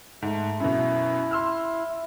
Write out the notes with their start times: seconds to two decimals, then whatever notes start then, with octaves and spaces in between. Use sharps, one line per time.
0.22 G#2 A3
0.60 F#2 B2 E4
1.31 C6 E6 F6